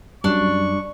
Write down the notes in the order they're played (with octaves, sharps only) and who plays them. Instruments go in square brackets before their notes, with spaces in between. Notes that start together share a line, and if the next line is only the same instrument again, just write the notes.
[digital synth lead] F#2 [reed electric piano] G3 [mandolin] D4 [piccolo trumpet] C#6